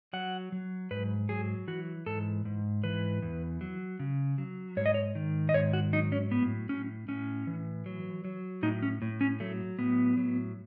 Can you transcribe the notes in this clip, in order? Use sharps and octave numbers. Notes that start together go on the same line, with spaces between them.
F#3 F#5
F#3
G#2 B4
F#3 G#4
E3 F#4
G#2 A4
G#2
E3 B4
E2
F#3
C#3
F#3
G#2 C#5
D#5
C#5
D#3
D#5
G#2 C#5
F#4
F#3 D#4
C#4
A2 B3
A2 C#4
A2 C#4
E3
F#3
F#3
A2 D#4
C#4
A2
C#4
F#3 A3
A2 B3
F#3